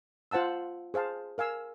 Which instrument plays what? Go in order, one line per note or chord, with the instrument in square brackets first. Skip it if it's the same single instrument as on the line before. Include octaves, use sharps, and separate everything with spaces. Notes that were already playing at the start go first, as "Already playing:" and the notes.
[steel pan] F4 C5 F#5 A5 E6
G#4 C5 F5 A5
A#4 F5 G#5 E6